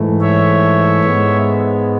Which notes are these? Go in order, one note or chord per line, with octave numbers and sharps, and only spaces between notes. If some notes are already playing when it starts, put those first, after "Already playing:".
Already playing: G#2 E3 A3
C#5 E5
G#2 G#3 B3